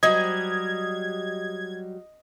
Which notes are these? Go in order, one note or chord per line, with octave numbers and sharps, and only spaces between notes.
F#3 G3 G4 D#5 G#6